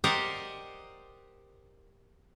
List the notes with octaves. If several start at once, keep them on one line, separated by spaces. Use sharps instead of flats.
G4 A#4 C5 D5 D#5 F#5